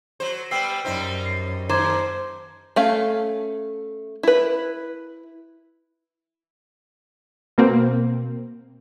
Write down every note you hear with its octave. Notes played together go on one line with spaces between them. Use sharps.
F#3 C5
G3 B3 G5 E6 C7
F#2 G3 D#4 C5
C7
D#2 C5 A#5 D6 G#6
A3 C#4 F5
E4 B4
B2 A#3 C4